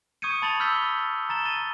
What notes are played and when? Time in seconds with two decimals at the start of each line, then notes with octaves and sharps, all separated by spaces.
0.22 C#6 D#6 G6 G#6 C#7 D#7
0.42 A5 B5 A6 D#7 F7 F#7
0.60 B5 E6 F6 G6 B6 G7
0.83 A6
1.29 A#5 A6 E7 G7
1.45 A#5 A6 D#7 E7